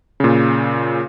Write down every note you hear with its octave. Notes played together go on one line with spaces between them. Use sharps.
A#2 C#3